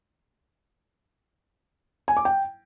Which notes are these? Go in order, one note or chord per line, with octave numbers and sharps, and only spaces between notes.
G#5
D6
G5